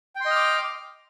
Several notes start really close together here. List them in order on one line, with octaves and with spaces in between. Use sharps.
G5 C6 D#5 F6 D6